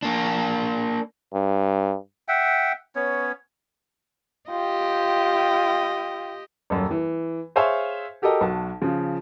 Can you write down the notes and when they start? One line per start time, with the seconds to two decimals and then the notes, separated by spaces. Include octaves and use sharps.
0.03 A#3 D4
1.34 G2
2.28 E5 F#5 G5
2.95 B3 C#4 C#5
4.50 F4 G4 D#5 G5
6.70 D#1 F#2
6.91 E3
7.56 G#4 C5 C#5 E5 F5 G#5
8.22 F#4 G4 A4 A#4 D#5
8.41 B1 F#4 A5
8.82 C#3 F3